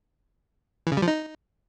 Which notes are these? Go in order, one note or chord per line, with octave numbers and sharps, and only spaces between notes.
E3
C#3
G3
F3
D#4